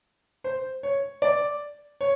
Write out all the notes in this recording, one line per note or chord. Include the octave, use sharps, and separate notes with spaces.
C5
C#5
D5
C#5